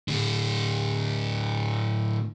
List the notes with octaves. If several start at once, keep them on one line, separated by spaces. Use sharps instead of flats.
A2 D3